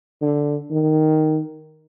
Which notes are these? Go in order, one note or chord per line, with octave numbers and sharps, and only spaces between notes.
D3
D#3